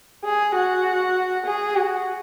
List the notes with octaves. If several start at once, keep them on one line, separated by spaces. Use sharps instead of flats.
G#4
F#4
G#4
F#4